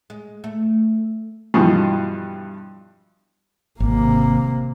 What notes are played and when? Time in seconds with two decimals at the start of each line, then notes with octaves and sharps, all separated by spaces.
0.10 G#3
0.44 A3
1.54 G2 B2 E3 F3
3.80 G#1 C3 A#3